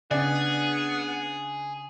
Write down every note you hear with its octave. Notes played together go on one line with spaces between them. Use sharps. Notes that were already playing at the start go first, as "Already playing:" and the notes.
C#3 B3 D4 G#4 D5